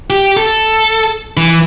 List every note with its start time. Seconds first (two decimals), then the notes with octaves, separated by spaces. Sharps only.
0.10 G4
0.37 A4
1.37 E3